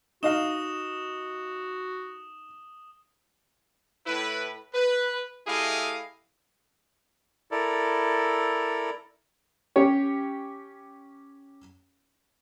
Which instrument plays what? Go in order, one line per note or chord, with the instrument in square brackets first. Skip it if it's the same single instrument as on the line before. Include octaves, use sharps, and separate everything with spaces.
[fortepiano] D#4 D#5 F5 [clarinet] F#4 [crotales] D#6 E7 G7
[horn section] A2 E4 B4
B4
A3 E4 G4 G#4 D#5 F5
[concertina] E4 A4 A#4 D5
[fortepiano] C#4 G4 C#5